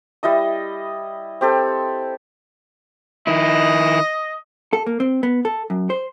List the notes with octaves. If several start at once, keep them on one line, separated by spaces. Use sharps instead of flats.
G3 E4 D#5 D#6
C4 G4 A4
D#3 E4 D#5
A4
A#3
C4
B3
A4
F#2
C5